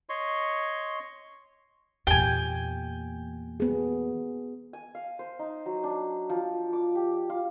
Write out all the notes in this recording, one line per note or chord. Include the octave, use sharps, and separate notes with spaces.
C#5 D#5 C6 C#6
E2 A#2 G4 G5 G#5
B3 G#4
G#5
F5
C5
D#4
F#3
D4
F3
D6
G4
F4